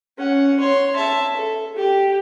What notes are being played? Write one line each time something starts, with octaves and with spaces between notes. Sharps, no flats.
C#4 F#5
C#5 C6
E5 A5
A4
G4